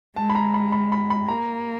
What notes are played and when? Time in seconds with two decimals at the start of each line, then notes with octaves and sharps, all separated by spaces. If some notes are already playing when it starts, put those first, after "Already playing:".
0.16 G#3 A5
0.30 B5
0.35 A#5
0.54 B5
0.72 B5
0.92 B5
1.10 B5
1.28 A#3 A#5